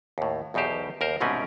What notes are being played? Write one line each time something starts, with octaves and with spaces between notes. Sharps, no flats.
D#2 A2
B1 E2 B2 D#4 G4 C5
D#2 A#4 C5
C2 G#2 B2 C4 C#4 B4